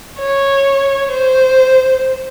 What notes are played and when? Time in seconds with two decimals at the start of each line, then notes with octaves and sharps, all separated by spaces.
0.18 C#5
1.12 C5